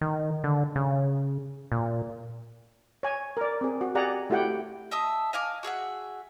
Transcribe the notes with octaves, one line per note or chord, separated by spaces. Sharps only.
D#3
D3
C#3
A#2
C#5 G#5
A#4 D5
C4 G#4
F#4
G4 G#4 D5 F#5 G#5 A#5
A3 E4 F#4 G4 F#5 G5
D#5 E5 A5 D#6
D#5 F5 G#5 D6
F#4 G#4 E5 F#5